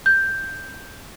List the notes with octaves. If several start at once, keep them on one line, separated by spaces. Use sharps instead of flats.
G6